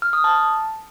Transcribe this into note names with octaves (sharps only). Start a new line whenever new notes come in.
F6
D#6
A5